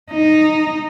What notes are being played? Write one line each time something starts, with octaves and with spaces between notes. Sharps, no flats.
D#4